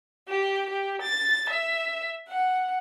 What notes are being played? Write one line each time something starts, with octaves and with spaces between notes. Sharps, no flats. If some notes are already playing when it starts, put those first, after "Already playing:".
G4
G4
A6
E5
F#5